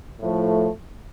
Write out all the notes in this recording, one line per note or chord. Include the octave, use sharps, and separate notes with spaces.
A2 F3 A3